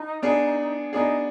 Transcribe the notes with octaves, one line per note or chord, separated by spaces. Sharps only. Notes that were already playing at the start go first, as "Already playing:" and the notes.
Already playing: D#4
B3 D4 G#4
B3 D4 D#4 G#4